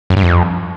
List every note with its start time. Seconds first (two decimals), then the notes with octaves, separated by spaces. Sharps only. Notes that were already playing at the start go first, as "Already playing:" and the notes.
0.10 F#2
0.16 G2
0.23 F2